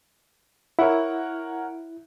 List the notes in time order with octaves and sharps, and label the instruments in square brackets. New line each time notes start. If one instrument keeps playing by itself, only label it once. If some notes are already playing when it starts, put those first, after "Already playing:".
[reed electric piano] E4 [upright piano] A#4 C#5 F#5